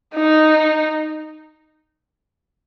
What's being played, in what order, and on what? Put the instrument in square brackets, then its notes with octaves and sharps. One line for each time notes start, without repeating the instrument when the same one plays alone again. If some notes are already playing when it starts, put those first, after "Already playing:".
[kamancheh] D#4